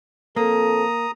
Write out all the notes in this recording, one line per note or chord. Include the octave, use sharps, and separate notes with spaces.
F2 A#3 C4 A4 A#5 D#6